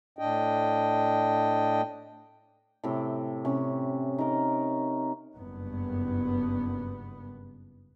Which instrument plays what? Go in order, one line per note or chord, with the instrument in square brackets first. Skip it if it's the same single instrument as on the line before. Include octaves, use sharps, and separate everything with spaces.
[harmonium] A2 D4 D#5 G5
[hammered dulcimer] A2 C3 G5
C3 C#4
D#4 A#4
[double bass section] F#1 G2 B3